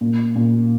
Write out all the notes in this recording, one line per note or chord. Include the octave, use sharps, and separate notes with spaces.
A#2
A#2